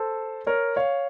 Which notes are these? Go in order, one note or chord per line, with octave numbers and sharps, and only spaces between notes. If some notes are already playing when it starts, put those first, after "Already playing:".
Already playing: A4 C5
A#4 C#5
C#5 F5